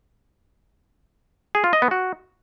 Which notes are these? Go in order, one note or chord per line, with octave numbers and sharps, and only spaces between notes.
G#4
F4
D#5
B3
F#4